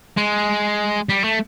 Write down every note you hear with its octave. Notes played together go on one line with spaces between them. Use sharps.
G#3
G3
A3